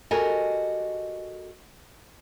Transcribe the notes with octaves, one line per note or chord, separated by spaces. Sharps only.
F#4 G4 A4 A#4 D#5 G#5